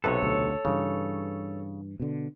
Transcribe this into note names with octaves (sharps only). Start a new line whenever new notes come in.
B1 C3 A4 B4 C#5
D2
G2 C#3 E3
B2 D3